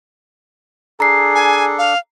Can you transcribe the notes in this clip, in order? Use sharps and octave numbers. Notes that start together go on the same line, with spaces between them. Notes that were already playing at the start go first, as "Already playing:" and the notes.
D4 G#4 A4 A#5 C7
G#5
F5